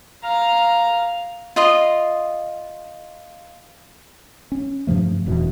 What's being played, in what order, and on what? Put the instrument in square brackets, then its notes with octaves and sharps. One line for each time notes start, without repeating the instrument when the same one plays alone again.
[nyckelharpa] F5 A#5
[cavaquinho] F4 D#5 C6
[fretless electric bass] C#4
G2 C3 F3 A3
E1 F#2 B2 E3